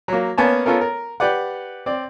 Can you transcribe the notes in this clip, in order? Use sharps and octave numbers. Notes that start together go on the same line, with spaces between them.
F#3 A#3
A#3 B3 C#4 C#5 G#5 A5
B3 C#4 F4 A4 A#4
A#4
G4 B4 D5 F#5
C4 D5